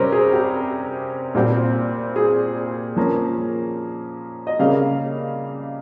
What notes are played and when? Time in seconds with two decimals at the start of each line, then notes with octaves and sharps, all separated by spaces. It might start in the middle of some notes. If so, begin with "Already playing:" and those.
Already playing: C3 G3 C#4 A#4 C5
0.12 G#4
0.33 G4
1.35 A#2 G3 C4
2.16 G#4
2.96 F3 A#3 C#4
4.47 D#5
4.59 C#3 G3 A#3 C#4 F5